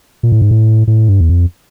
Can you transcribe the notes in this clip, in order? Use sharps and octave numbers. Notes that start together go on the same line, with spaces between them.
A#2
A2
G#2
A2
A2
G2
E2
F2